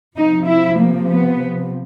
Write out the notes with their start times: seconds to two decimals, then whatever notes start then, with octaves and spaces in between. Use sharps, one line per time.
0.17 C3 F3 D#4
0.48 E4
0.80 A#3
1.11 B3